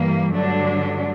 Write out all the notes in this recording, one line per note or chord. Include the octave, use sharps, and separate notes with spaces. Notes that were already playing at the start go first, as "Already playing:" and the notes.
Already playing: G2 E3 G3 A#3
G2 D3 F#3 A3 D4